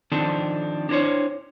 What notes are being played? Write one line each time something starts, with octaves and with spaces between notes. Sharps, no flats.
D#3 F3 C4 D4 D#4 A4
D4 E4 A#4 C5 C#5